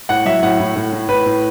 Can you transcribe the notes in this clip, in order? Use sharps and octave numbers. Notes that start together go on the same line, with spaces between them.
A2 F#5
F#3 E5
A2 F#5
A2
A2
A2
A2 B4
A2